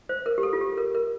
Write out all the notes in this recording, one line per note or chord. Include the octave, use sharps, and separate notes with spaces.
C5
A#4
G4
A4
F4
G4
A#4
A#4